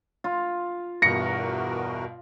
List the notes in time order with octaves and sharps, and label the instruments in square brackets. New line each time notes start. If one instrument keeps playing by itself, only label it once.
[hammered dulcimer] F4
[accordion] E2 F#4 A#4 [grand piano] G2 B2 [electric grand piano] A#6 C#7